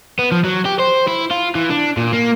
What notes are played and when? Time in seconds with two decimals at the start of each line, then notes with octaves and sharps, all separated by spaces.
0.19 B3
0.32 F3
0.44 F#3
0.65 G4
0.79 C5
1.07 E4
1.31 F4
1.55 E3
1.70 D4
1.97 A#2
2.13 A#3